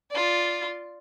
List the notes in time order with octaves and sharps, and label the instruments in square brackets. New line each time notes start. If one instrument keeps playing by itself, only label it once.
[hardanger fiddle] F4 D5